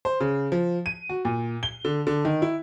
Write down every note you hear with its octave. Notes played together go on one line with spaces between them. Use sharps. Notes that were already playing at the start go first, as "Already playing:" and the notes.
C5
C#3
F3
D#7
F#4
A#2
G7
D3
D3
D#3
E4